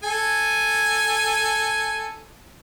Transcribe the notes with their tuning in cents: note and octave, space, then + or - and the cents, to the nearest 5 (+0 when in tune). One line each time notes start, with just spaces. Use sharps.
A4 +0 G#5 +0